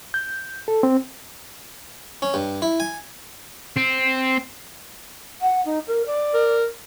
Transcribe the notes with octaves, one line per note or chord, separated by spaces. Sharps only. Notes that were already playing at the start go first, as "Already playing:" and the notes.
G6
A4
C4
C#4
G2
E4
G#5
C4
F#5
D#4
A#4
D5
A#4